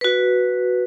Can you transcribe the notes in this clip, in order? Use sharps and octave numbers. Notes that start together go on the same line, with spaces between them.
F#4 B4